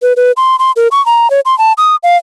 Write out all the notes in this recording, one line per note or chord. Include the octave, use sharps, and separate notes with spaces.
B4
B4
C6
C6
A#4
C#6
A#5
C#5
C6
A5
D#6
F5